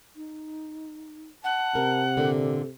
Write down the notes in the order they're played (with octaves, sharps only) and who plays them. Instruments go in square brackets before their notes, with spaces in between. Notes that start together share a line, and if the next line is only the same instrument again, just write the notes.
[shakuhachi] D#4
[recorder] F#5 [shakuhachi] A5
[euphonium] C3 [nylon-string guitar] A#4
[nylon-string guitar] A#2 D3 [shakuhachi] A4